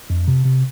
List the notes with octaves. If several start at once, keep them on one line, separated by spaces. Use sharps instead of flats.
F2
C3
C3